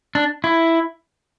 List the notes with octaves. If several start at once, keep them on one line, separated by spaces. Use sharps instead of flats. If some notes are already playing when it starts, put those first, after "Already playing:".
D4
E4